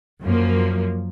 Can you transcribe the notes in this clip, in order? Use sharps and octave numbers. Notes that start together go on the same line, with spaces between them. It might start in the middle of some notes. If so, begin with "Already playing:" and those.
F#2 F3 A#3